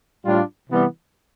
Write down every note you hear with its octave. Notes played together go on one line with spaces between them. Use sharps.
A2 G3 D4 F4
C3 E3 G3 B3